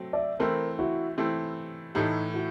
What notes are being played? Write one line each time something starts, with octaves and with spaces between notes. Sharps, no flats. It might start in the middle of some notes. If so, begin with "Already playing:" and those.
Already playing: F#3 A3 C4
D5 E5
E3 A3 C4 E4 A#4 C5
E4 F#4
E3 A3 C4 E4
A2 E3 A3 D#4
E4 F#4